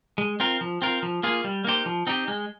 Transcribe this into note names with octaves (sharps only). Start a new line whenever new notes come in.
G#3
C4 F4 A#4
F3
C4 F4 A#4
F3
A#3 F4 G#4
G3
A#3 D#4 G4 C5
F3
C4 D#4 G4
G#3